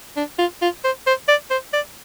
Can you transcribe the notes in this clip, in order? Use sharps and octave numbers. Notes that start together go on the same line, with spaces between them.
D4
F4
F4
C5
C5
D5
C5
D5